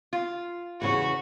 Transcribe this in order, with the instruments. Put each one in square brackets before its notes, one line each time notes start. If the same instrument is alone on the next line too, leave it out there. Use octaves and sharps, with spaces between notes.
[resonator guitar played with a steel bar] F4
[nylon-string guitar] E2 C#3 C#5 [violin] F#4